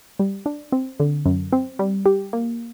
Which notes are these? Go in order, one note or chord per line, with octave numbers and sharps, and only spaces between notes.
G3
D4
C4
D3
F#2
C4
G3
G4
A#3